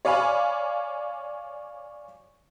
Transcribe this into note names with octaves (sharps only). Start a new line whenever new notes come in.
C#5 D5 F5 G#5 B5